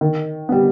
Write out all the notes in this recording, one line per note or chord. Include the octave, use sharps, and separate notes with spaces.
D#3
G3 B3